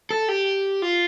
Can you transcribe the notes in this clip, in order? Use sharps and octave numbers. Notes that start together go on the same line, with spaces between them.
A4
G4
F4